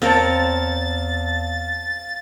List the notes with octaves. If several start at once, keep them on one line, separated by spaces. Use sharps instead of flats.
E2 C4 A#4 C#5 F5 A5 A6